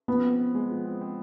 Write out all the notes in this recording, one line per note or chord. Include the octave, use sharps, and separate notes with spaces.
F3 B3
C4
C4
G#3
F3
C4
C4